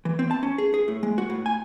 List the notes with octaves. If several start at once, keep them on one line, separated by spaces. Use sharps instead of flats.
E3
C4
A5
C#4
G#4
G#4
A2
G#3
F#4
A2
G#5